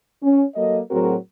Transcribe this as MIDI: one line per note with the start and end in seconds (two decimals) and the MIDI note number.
0.23 0.44 61
0.55 0.80 54
0.55 0.80 58
0.55 0.80 69
0.55 0.80 75
0.91 1.14 45
0.91 1.14 54
0.91 1.14 60
0.91 1.14 66
0.91 1.14 68
0.91 1.14 70